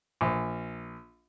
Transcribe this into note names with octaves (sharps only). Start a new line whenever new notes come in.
A#1